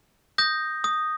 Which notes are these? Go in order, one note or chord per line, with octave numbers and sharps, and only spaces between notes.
D#6 G6 A#6
D#6